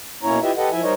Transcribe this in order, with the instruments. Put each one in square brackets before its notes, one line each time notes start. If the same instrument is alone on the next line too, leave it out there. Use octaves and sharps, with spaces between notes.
[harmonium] B2 A#3 C#4 E4 C#5 A#5
E4 F4 G4 B4 D#5 E5
G4 A4 B4 D#5 F#5
F3 E4 E5 G#5
G3 D#4 A#4 C5 C#5 D#5